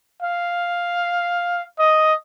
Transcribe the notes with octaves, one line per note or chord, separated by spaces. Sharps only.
F5
D#5